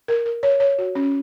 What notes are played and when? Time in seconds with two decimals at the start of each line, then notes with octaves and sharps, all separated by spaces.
0.08 A#4
0.25 A#4
0.43 C#5
0.60 C#5
0.78 F#4
0.95 C#4